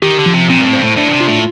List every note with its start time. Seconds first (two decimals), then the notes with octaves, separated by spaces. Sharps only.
0.02 D#3 G4
0.19 D3
0.26 F3
0.34 C3
0.49 A#2 C4
0.59 G2
0.65 A2
0.73 G2 C5
0.81 A2
0.97 A2 D4
1.09 A#2
1.13 C3
1.20 F4
1.28 A2